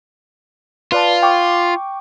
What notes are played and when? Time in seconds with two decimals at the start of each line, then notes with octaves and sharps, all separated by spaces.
0.92 F4 B4 D5 A5
1.22 G5 C#6 D6